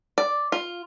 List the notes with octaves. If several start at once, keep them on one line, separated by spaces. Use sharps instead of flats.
D5
F4